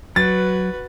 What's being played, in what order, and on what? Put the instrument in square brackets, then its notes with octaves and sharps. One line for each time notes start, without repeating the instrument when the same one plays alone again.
[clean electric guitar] F#3 [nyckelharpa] F#4 B4 [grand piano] A6